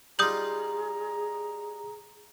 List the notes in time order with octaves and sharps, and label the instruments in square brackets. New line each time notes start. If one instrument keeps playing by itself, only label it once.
[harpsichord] G3 D#4 F4 [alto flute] G#4 [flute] A#5 [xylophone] D#6 G6 F#7